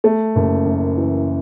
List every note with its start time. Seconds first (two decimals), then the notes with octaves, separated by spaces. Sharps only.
0.04 A3
0.36 F#1
0.66 F#2
0.97 E3